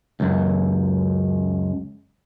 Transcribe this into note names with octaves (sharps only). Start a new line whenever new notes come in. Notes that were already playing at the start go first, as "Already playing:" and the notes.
C#2 F#2